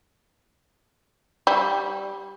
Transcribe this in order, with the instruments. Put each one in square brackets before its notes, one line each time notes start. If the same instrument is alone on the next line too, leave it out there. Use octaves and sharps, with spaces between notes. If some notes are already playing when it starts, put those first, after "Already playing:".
[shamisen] G3